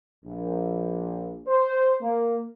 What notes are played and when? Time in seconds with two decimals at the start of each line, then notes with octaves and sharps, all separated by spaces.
0.25 A#1
1.47 C5
2.02 A#3